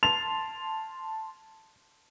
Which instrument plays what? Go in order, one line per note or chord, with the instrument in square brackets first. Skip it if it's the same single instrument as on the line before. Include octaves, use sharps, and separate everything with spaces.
[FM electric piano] A5 C6 [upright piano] F7